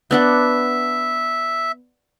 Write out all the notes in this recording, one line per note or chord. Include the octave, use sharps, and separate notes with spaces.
B3 D4 E5 F#5